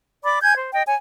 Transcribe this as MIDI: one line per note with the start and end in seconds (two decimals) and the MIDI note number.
0.23 0.39 74
0.23 0.39 83
0.23 0.39 86
0.41 0.53 80
0.41 0.53 91
0.41 0.53 92
0.56 0.70 72
0.72 0.83 75
0.72 0.83 79
0.86 0.95 73
0.86 0.95 80